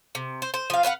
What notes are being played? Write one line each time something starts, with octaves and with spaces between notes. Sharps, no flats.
C3
C5
C5
F3 F5
B4 C5 F5 F#5